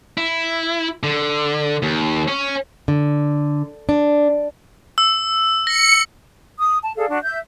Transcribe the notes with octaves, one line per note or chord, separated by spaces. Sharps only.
E4
D3
D#2
C#4
D3
D4
E6
A#6 C#7
D#6
A5
G#4 A4 D5 F5
D4 F#4
E5 G6